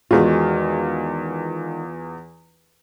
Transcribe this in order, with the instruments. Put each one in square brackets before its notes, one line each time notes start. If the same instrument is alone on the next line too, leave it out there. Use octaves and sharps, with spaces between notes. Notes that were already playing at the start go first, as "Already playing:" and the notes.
[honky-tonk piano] E2 F4 [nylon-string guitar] D#3 G#3 F#4